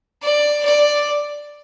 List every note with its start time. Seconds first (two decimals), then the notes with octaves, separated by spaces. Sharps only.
0.22 D5
0.65 D5